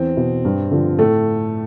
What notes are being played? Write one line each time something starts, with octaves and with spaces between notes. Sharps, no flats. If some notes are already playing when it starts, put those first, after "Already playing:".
Already playing: E2 C4
B2
G2
D3 F3
A2 A3